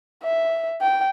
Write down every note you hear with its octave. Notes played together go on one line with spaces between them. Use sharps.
E5
G5